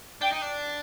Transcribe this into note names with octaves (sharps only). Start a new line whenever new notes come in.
D4 G5
D#4
D4